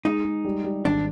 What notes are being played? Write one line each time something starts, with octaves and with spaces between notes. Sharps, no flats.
G#3 D#4
G#3
G3
G3
G#1 D4